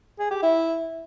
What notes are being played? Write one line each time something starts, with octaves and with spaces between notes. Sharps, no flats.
G#4
G4
E4